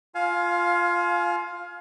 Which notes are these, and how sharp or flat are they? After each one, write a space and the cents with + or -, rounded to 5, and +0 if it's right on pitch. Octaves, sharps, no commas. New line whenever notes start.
F4 +0 F5 +15 G#5 +35